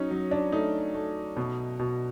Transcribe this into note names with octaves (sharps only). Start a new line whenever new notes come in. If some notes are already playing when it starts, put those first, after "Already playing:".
Already playing: F#3 C#4 D#4
F#3
D4
A3 D#4
A3
B2
B2